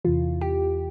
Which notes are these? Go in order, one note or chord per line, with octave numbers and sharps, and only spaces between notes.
E2 C3 E3 F4
G4